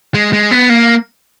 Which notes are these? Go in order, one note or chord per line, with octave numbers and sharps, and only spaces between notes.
G#3
G#3
B3
A#3